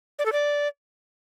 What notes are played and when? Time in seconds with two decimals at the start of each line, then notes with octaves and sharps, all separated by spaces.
0.19 D5
0.26 A4
0.32 D5